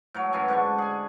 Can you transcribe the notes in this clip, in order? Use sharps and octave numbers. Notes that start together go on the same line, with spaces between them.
A2 F#3 C#5
F#2 E3 G#5
G#2 D3 D4 C#6
G#4 G#5